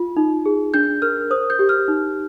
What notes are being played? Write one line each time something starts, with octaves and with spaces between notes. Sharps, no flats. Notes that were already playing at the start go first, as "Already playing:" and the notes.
Already playing: F4
D#4
G#4
D4 G6
A#4 F6
C5 D#6
G6
G4
F6
D#4